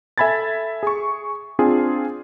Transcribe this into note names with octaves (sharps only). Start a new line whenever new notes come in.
A4 E5 G#5 B5 G#6 A6
G#4 C#6
C4 D4 F4 G#4